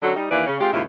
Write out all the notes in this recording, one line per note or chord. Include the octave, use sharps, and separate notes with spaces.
D3 F#3 C#4 D4 F#4 A4
G3 D#4
D#2 E3 A#3 D4 B4 D5
C#3 C#4
G#3 C4 F4 G4
D#2 G#2 C#3 E4 F4